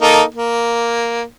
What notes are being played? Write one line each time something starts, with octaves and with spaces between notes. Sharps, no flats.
A#3 D#4 A4
A#3